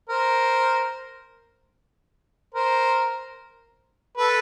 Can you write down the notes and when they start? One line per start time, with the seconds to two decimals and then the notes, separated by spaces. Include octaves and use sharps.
0.09 A#4 C5
2.54 A#4 C5
4.17 A4 B4